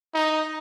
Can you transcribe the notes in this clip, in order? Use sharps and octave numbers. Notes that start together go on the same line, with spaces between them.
D#4